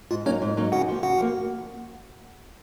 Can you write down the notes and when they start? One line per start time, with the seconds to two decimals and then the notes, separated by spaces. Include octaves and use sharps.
0.11 G#2 F4
0.26 F#3 A#3 C#4 D#4 C#5
0.42 G#2
0.57 F#3 A#3 D#4
0.72 C#3 F#4 F#5
0.88 F3 A#3
1.03 C#3 F#4 F#5
1.18 F3 A#3